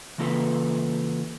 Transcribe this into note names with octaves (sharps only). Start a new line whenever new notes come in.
C#3 E3 A#3 F4 A4 B4